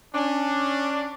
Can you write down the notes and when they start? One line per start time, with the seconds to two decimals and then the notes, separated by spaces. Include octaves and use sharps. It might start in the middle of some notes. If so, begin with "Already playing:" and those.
0.14 C#4 D4